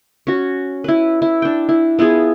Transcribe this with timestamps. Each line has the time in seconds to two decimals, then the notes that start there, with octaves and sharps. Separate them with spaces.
0.27 C#4 F#4
0.84 E4 B4
1.22 E4
1.42 D4 G5
1.69 E4
1.99 B3 E4 F4 G#4